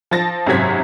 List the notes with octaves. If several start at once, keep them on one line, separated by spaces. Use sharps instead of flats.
F3 A5 A6 A#6
G#1 F#2 C3 F#3 G#6 B6